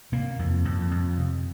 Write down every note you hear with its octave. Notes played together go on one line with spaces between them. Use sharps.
C3 A#3
F2
F2
F2
C3